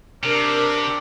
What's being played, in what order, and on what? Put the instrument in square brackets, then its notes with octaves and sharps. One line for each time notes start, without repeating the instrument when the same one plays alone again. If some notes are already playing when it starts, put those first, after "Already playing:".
[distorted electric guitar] C3 [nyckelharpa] D4 D5 [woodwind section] A#4